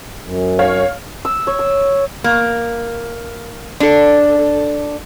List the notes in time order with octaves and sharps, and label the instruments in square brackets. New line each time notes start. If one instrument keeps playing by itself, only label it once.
[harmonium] F#2
[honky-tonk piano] C#5 F5 F6
[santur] E6
C#5
E6
[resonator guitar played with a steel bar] A#3
D4 A4